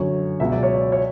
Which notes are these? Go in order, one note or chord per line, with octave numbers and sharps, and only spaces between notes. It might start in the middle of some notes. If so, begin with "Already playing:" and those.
Already playing: F#2 D3 F#3 C#5
C#2 B2 F#3 E5
D5
C#5
D5
C#5